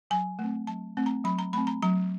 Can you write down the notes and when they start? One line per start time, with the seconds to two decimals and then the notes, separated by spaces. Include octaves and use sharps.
0.11 F#3 G#5
0.39 A3 C4
0.67 F#3 A5
0.97 A3 C4
1.06 A#5
1.24 F#3 B5
1.39 A#5
1.53 A3 C4 B5
1.67 A#5
1.82 F#3 A#5